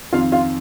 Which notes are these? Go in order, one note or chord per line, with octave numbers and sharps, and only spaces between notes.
F2 D#3 F4 F5
F4 F5